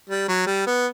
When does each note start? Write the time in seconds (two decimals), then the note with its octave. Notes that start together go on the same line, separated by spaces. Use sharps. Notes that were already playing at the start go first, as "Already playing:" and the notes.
0.10 G3
0.28 F#3
0.47 G3
0.67 B3